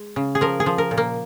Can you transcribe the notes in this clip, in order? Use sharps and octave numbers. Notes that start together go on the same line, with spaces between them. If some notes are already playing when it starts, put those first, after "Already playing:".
Already playing: G#3
C#3
G#4
F3 A#4
G#4
F3
A#4
A#2
A#3